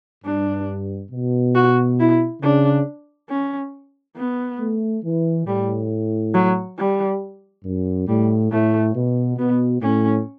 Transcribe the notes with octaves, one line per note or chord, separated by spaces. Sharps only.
G2 D4
B2
F#4
E4
C#3 D4
C#4
B3
A3
E3
A2 G3
F#3
G3
F#2
A2 G3
A2 A3
B2
B2 B3
A2 C#4